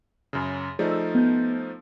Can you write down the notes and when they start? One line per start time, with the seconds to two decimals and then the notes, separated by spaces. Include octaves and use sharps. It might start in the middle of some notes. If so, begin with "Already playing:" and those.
0.33 F#2 C#3
0.79 F3 A3 D#4 G#4 D5
0.91 E6
1.15 B3 G6